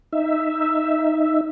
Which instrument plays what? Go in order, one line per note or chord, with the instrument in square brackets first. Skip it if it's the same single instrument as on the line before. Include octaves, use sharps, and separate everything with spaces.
[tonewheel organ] D#4 E5